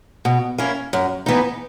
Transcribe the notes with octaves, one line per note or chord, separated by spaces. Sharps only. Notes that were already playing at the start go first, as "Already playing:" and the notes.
B2
A#3 C#4 E4
F#2
E3 B3 D#4